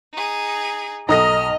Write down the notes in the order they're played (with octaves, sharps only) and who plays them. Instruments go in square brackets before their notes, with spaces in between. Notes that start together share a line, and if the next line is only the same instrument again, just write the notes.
[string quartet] D#4 G#4
[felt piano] B1 A4 [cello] D#5 [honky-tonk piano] A#5 D#6 A#6 [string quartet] F6